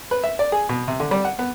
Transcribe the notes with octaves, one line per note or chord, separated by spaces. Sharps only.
B4
E5
D5
G#4
B2
C3
D3
G3
F#5
B3